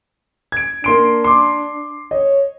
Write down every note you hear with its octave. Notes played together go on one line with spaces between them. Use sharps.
G#6 D7
A#3 D4 C6 D7
C6 D6
C#5 D#5